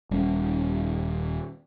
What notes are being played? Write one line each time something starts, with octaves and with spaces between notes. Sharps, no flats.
D#1 G3 C#4